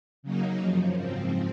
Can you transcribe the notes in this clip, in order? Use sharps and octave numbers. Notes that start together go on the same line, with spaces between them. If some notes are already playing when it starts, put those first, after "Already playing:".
C#3 F#3 A#3 D#4
F#2 C#3 F3
G#2 F3 C4